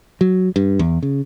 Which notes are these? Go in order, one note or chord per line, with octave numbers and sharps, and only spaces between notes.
F#3
G2
E2
C#3